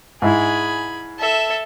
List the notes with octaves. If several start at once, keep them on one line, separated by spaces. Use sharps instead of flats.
G#2 E4 G#4 B5
A4 E5